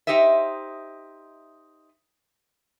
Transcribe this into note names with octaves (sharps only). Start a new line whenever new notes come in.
D#4 G4 C5 D#5 E5